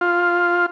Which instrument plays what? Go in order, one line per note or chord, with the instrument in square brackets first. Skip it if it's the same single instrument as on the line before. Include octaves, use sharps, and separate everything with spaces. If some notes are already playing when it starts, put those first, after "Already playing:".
[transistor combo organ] F4